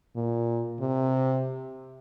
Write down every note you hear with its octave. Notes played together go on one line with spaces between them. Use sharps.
A#2
C3